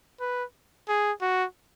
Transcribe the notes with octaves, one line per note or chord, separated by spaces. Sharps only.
B4
G#4
F#4